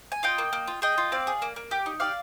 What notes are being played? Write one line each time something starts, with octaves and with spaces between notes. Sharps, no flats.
G#5
F4 D#5 G5
A#3
A#3
F4
G#4 D#5 G5
F4
C4 D5 F5
G#4
A#3
A#3
G4
D#4
G4 D5 F5